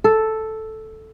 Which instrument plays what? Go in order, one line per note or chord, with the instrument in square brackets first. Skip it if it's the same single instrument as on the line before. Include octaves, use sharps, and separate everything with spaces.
[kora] A4